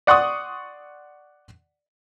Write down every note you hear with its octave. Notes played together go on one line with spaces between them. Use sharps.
D5 F#5 C6 C#6 D#6